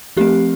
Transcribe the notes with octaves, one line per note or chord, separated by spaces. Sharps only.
F3 A3 C4 G4